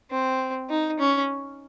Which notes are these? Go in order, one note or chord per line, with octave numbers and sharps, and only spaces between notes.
C4
D#4
C#4